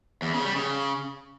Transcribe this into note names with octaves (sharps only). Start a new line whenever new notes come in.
E2
C#3
G3
C#3